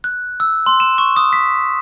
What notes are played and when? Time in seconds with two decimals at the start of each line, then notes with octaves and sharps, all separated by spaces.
0.04 F#6
0.40 E6
0.66 C6
0.80 E7
0.98 C#6
1.16 D#6
1.33 B6